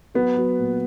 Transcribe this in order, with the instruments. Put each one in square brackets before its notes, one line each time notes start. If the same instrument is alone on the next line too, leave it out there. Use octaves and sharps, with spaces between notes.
[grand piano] F#3 B3
F#3
A#2